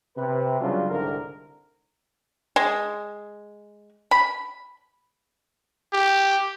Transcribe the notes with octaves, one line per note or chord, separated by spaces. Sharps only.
C3 B4
C#3 F#3 G3 C#4 D4 F4
C2 G#2 D3 A#4
G#3
B5
G4